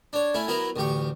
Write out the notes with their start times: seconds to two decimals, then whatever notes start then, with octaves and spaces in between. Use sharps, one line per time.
0.13 D4 C#5
0.34 A3 C#4 E4
0.48 F#3 B3 E4 A#4
0.76 A1 D2 G4 C#6